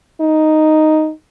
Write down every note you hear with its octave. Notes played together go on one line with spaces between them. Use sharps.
D#4